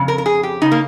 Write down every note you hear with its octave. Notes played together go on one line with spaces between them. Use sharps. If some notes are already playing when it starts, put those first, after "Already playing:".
Already playing: F2 C#3
A#4
A#4
G#4
G4
C#3 D#4
A#3